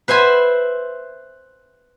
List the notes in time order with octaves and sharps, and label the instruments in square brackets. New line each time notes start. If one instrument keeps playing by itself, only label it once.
[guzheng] B4 C5 E5 G#5 B5